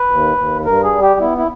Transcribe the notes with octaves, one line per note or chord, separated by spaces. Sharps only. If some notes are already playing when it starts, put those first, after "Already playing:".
Already playing: B4
D#2
D#2
G2 A#4
G#4
G3
G4
B3 E4
E4